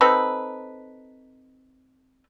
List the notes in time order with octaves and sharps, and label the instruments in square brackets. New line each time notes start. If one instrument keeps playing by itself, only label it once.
[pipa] C4 D#4 A4 B4